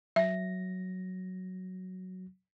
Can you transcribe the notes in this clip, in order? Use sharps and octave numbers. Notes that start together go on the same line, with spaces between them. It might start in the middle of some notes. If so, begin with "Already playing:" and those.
F#3 E5 A#6